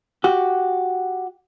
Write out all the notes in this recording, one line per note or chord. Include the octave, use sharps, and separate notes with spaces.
F#4 G4